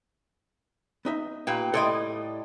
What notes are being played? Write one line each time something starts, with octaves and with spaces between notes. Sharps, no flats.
B3 D#4 E5
A#2 G4 B4
A2 G3 A4 D#5 C6